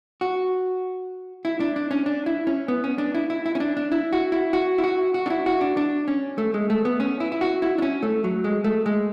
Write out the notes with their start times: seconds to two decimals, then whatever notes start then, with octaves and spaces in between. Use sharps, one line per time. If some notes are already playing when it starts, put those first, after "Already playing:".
0.21 F#4
1.45 E4
1.60 D4
1.76 D4
1.91 C#4
2.06 D4
2.26 E4
2.47 C#4
2.68 B3
2.84 C#4
2.98 D4
3.15 E4
3.30 E4
3.46 E4
3.55 C#4
3.60 D4
3.77 D4
3.92 E4
4.13 F#4
4.32 E4
4.53 F#4
4.78 E4
4.84 F#4
5.14 F#4
5.26 D4
5.30 E4
5.46 F#4
5.61 D4
5.77 D4
6.08 C#4
6.38 A3
6.54 G#3
6.70 A3
6.85 B3
7.00 C#4
7.20 E4
7.32 E4
7.41 F#4
7.62 E4
7.78 D4
7.82 C#4
8.03 A3
8.24 F#3
8.44 G#3
8.64 A3
8.86 G#3